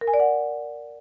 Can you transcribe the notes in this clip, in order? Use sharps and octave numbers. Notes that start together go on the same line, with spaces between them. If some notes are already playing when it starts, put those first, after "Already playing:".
A#4
G#5
D5
F#5